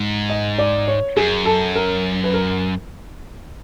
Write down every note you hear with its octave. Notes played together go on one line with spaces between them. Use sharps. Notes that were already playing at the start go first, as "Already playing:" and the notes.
Already playing: G#2
D#5
D5
C#5
F#2 G#4
A4
A#4
B4
A#4